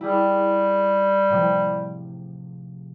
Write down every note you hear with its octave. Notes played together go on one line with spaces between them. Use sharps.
G3 E4 G4 G#4
A2 C3 F3